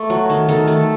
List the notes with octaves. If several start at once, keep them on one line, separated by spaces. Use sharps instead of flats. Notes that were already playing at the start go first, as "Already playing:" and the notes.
Already playing: A3
F#3
D#3
D#3 A4
A3